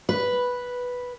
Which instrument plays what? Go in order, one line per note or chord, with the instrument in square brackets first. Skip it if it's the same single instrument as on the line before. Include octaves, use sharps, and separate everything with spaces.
[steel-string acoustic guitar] B4